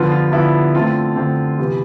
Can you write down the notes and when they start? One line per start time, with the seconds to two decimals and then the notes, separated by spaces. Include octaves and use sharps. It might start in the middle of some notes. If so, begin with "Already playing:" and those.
Already playing: D3 F3 B3 F4
0.12 F4
0.32 D3 F3 B3 E4
0.75 D3 A3 C4 F4
1.16 D3 A3 C4
1.59 C3 E3 B3